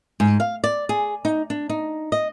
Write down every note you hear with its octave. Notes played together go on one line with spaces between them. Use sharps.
G#2
F5
D5
G#4
D#4
D4
D#4
D#5